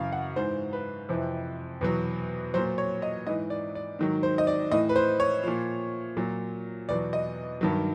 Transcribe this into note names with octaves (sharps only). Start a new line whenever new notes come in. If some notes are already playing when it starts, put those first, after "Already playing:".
Already playing: F#2 C#3 E3 F5
F#5
G#2 E3 C5
B4
F2 C3 E3
E2 B2 F#3
A#2 F#3 C5
C#5
D#5
G#2 E3 D#5
D5
D5
G#2 D#3 F#3
C5
D#5
D5
A2 E3 D#5
B4
C5
C#5
A#2 F3
A#2 F#3
E2 B2 F#3 D5
D#5
G2 D#3 F#3